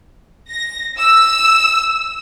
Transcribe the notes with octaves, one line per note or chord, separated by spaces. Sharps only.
A#6
E6